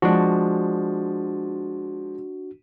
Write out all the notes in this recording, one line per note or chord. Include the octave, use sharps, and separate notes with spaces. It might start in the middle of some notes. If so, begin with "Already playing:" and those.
F3 G#3 D4 F#4